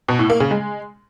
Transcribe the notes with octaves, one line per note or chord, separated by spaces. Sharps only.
B2
A2
A#3
C#3
G#3